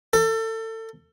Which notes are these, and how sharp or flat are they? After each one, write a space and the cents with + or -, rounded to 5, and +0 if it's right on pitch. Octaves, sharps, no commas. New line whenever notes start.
A4 +30